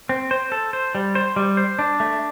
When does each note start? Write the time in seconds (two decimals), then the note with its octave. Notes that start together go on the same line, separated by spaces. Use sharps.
0.09 C4
0.31 C5
0.52 A4
0.73 C5
0.95 G3
1.15 C5
1.36 G3
1.57 C5
1.79 D4
2.00 A3